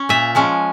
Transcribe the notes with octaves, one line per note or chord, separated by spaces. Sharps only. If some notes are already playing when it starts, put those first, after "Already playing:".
Already playing: C#4
A#2 E5
F3 G#3 C#4